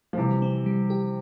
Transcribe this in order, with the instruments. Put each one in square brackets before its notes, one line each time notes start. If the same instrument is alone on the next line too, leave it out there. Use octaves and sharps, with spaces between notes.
[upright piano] F3
[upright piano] C3 E3 [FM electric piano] G3
[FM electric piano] C4
G3
G4